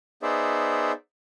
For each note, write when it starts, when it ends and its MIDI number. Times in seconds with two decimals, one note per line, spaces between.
0.22 0.92 59
0.22 0.92 63
0.22 0.92 68
0.22 0.92 72
0.22 0.92 74
0.22 0.92 76